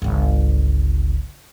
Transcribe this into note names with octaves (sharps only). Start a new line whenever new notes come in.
G1 C#2